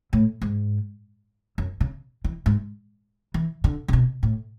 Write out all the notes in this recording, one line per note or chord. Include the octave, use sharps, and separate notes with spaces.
A2
G#2
F#2
C#3
E3
G#2
E3
D3
C#3
B2
A2